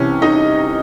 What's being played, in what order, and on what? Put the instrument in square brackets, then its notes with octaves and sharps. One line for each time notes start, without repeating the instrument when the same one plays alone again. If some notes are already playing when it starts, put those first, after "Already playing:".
Already playing: [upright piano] C2 C3 E3 C#4
D#4 D#5